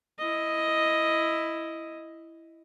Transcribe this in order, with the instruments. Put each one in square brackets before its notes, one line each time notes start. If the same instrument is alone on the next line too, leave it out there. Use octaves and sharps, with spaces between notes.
[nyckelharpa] E4 D#5